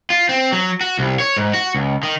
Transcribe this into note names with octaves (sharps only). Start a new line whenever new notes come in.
F4
C4
F#3
F#4
C2
C#5
G#2
F#4
C#2
D#3